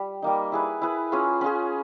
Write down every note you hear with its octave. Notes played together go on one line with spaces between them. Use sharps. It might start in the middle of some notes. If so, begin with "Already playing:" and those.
Already playing: G3
G3 A#3 D#4
E4 G#4 B4
E4 G#4 B4
C#4 F4 G#4
C#4 F4 G#4